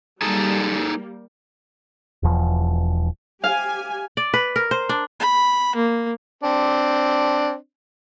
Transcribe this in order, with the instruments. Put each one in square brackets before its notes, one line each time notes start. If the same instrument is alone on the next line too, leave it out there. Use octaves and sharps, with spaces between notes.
[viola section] G3 A#3 [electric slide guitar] D#4 G#4 A4
[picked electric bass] E1 E2 F3
[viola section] G4 G#5 [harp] F5
[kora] D5
B4
A#4
C5
D4
[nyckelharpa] B5
A#3
[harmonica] C4 D4